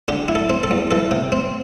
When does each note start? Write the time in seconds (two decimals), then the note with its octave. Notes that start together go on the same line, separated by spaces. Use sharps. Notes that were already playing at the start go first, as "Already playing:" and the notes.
0.08 D3 G4
0.28 E4
0.35 A4
0.50 C4
0.63 A4
0.71 E2
0.91 E3 A4
1.11 C3
1.32 C4